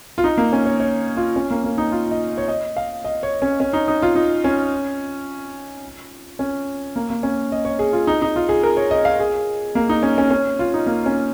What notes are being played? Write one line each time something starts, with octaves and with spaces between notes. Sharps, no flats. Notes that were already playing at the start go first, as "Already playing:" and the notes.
F4
D#4
A#3
C#4
C#5
C#5
F4
C#4
A#3
A#3
D#4
F4
D#5
C#5
D#5
F5
D#5
C#5
C#4
C#4
D#4
D#4
F4
D#4
C#4
C#4
A#3
A#3
C#4
D#5
C#5
G#4
F4
D#4
D#4
F4
G#4
A#4
C#5
D#5
F5
G#4
A#3
D#4
C#4
C#4
C#4
F4
D#4
A#3
C#4